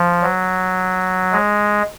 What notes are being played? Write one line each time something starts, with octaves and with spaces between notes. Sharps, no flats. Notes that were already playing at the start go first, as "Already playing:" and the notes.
Already playing: F3
F#3
G#3